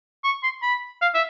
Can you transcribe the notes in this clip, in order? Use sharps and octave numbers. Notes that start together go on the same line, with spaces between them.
C#6
C6
B5
F5
E5